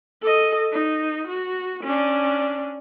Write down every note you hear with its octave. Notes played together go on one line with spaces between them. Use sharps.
A4 D#5
D#4
F#4
C#4 D4